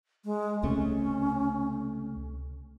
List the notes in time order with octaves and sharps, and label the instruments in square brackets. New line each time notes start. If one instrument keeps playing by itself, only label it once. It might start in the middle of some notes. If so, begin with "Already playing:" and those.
[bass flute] G#3
[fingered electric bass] C#2 C3 A3 [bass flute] C#4